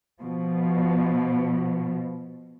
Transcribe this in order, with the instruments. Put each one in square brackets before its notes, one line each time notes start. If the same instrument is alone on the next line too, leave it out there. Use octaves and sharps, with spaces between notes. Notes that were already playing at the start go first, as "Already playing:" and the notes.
[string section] B2 F3